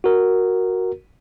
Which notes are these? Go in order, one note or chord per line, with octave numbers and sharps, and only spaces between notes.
F#4 A#4